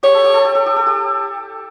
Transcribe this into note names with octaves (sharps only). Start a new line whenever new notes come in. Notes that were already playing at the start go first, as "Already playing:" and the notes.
G4 C#5
A4
G4
A4
G4
A4
G4
A4
G4